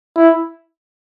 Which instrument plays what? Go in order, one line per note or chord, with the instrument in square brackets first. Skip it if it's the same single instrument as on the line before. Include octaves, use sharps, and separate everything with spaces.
[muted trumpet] E4